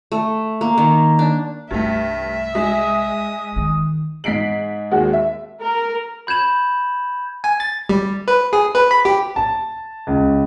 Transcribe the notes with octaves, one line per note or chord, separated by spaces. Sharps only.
A3
A#3
D#3
D4
C2 G2 A3 E5
G#3 D#6
D#3
G#2 B6 C7 D7 F#7
D#2 G#3 F#4
E5
A#4
B5 G6 G#6 E7 F#7
G#5
A6
G3
B4
G#4
B4
B5
G4
A5
C#2